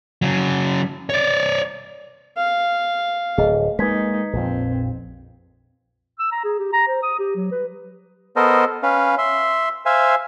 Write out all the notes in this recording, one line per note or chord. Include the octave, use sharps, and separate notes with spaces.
C#3 F#3
C#5 D5
F5
D1 G#4 D#5
G#3 A#3 D#4 B4 G#6 B6
A#1 F2 C4
E6
A#5
G#4
G4
A#5
C5
D#6
G4
F#3
B4
B3 A4 A#4 C5 D#5
C#4 B4 F5
E5 C6
C5 E5 F5 G#5